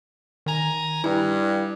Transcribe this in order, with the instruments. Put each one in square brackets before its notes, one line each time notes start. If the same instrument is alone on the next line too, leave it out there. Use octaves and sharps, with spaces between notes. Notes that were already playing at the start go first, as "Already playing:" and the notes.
[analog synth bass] D#3 [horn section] G#5 A#5
[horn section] G2 [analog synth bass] E4